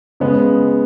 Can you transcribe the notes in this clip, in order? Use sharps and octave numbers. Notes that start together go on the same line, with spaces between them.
C#3 G#3 B3